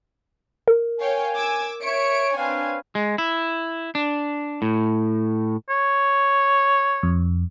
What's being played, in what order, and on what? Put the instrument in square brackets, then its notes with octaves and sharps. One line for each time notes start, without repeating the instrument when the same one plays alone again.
[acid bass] A#4
[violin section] C#5 F5 G5 [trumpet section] G#5
[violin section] D6 E6 G#6
[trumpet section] C#5 [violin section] E5 C#7 D7
[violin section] C4 D4 G#5 [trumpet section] B4 C#5 F5
[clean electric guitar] G#3
E4
D4
A2
[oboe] C#5
[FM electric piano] F2